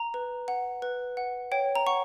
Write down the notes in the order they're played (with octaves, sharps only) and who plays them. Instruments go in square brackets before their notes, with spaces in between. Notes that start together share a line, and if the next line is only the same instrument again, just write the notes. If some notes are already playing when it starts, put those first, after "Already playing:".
Already playing: [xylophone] A#5
B4
F#5
B4
F#5
C#5 G5
A#5
F#5 C#6